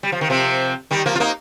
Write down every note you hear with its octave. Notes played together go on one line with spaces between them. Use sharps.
G3
F3
D#3
C3 F3
D#3 G3
F3 A#3
F4
A#3 D#4